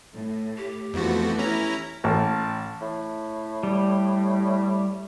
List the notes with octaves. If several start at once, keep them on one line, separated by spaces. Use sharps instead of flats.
A2
G4
F2 E3 F3 A3 B3 F#4
C#4 E4 A#5
A1 A5
A2
G3